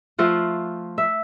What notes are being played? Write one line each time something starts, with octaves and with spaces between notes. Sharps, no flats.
F3 A3 F4 F#5
E5